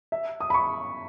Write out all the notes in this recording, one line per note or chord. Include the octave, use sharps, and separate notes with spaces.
E5
D#6
B5
C#6